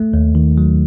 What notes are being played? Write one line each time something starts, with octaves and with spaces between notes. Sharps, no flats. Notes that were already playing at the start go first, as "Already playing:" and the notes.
Already playing: A3
D#2
D#3
F#3